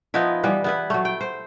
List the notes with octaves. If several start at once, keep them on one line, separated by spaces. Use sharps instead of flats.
F3 B3 D#4 E4
E3 G3 B3
B3 E4 B4
F#3 A3
G5
C5